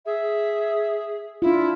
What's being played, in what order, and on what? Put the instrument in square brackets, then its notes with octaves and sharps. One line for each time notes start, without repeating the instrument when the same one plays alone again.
[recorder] G#4 [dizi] E5
[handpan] D4 F4 [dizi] E4